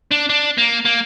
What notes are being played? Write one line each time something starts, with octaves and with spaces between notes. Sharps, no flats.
D4
D4
A#3
A#3